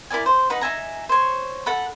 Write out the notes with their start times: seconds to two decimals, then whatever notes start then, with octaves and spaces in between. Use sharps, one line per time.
0.10 E4 A#4 D5 G#5
0.26 C5
0.50 D#4 B4 F#5
0.61 D#4 E5 G#5 A#5
1.09 C5 C#5
1.66 A4 F#5 B5